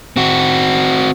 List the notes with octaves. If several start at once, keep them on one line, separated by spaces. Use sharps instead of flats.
C4 F#4